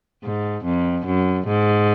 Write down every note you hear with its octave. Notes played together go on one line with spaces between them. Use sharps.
G#2
F2
F#2
G#2